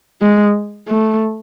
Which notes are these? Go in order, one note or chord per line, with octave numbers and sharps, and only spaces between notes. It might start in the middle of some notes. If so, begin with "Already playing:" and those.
G#3
A3